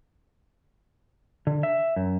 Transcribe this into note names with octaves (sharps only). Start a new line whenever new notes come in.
D3
E5
F#2